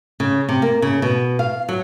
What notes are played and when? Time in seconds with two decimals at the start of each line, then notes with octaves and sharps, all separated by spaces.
0.20 C#3
0.49 C3
0.62 A#3
0.82 C#3
1.02 B2
1.39 F5
1.69 F#3